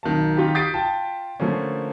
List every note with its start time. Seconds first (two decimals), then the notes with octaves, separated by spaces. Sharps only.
0.03 B1 D#3 A#3 A5
0.37 D#3 F4 G4
0.55 D#6 G6 A6 B6 C7 D7
0.74 F4 G5 A5
1.40 D3 F3 A3 A#3 C#4